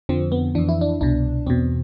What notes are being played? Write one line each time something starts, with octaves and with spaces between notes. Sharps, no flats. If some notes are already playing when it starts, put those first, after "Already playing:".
F2 D3 F3 C4
B3
F2 E3 D4
E4
D4
C2 B2 D4
E2 B2 C4